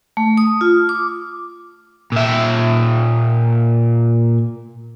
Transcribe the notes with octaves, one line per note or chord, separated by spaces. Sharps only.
A3
D#6
F4
D6
A#2 E5